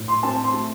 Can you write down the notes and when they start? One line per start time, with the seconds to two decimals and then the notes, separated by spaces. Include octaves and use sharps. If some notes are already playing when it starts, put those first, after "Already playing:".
Already playing: A2
0.08 C6
0.23 C4 A5
0.44 C6
0.54 A3